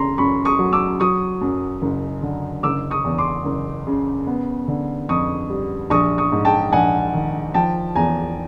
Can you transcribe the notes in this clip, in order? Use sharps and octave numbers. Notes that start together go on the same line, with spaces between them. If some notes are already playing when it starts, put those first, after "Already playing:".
Already playing: C#3 A#5 C6
F#2 B5 C#6
C#6 D#6
F#3
D6 E6
F#3 C#6 D#6
F#2
F#1
D3
F#1 D6 E6
C#6 D#6
E2
C6 D6
F#1
C#3
B3
D3
F2 C#6 D#6
G3
A#1 C#6 D#6
C#6 D#6
G#2
G5 A5
A#1 F#5 G#5
D#3
F3 G5 A5
E2 G#5 A#5